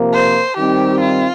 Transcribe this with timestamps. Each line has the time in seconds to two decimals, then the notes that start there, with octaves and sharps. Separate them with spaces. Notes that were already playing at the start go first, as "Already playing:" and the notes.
Already playing: C3 F3 A#3
0.13 C5
0.57 D#3 G3 C4 D#4 G4
1.01 F4